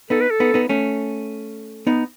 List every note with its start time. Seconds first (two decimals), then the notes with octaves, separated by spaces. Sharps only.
0.10 B3 D#4 A4
0.21 B4
0.31 A4
0.40 B3 D#4
0.54 B3 D#4
0.69 A3 C#4
1.87 B3 D#4